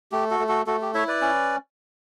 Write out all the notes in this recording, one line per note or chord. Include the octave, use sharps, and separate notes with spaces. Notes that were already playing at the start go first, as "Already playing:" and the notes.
A3 G4
F#4 A4
A3
F#4 A4
A3 F#4 A4
G4
E4 C#5 E5
B4 D5
C#4